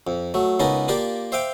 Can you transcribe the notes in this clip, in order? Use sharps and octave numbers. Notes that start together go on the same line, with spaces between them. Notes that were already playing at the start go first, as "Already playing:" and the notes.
F2
F#3 A3
C#2 B3 C#4 D#4 A#4 A5
A#3 F4 G4 A#4 D5 A5
C5 E5 F5 G5 D6